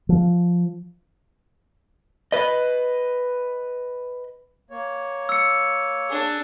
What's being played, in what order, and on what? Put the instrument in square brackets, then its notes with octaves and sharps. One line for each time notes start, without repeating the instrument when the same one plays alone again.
[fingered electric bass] F3
[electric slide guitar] B4 D#5
[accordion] A#3 C#5
[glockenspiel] E6 C#7
[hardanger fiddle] D4 G#4